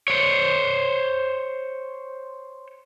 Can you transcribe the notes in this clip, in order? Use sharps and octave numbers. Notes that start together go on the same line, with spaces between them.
C5 C#5